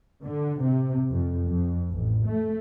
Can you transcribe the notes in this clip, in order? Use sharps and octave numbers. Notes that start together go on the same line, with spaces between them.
D3
C3
F2
F2
A1
A3